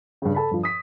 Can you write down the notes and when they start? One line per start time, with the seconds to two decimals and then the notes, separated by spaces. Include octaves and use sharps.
0.22 G2 C#3
0.35 A4 A5 B5
0.51 G2 F3
0.63 D#6 B6